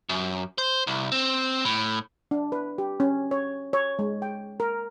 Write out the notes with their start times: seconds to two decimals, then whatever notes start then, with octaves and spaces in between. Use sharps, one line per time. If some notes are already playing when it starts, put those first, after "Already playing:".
0.09 F#2
0.58 C5
0.87 C2
1.12 C4
1.65 A2
2.31 D4
2.52 B4
2.78 G4
3.00 C#4
3.31 C#5
3.73 C#5
3.99 G#3
4.22 G5
4.60 A#4